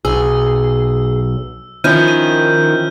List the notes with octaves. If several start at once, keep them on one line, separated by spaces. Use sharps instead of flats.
B1 G#4 E6
D#3 F3 C#4 E4 F6 G6 D#7
D#7